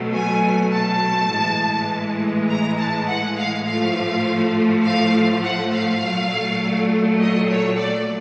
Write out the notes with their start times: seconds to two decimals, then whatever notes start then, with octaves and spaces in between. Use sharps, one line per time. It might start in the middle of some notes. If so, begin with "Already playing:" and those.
Already playing: B2 F#3 A3
0.14 G#5
0.73 A5
1.32 A2 E3 G#3
2.48 A#5
2.78 A5
3.07 F#5
3.37 F5
3.66 A2 F3 A3 F5
4.84 F5
5.42 F#5
5.72 F5
6.01 A#2 F#3 A3
7.18 D#5
7.48 C#5
7.77 D5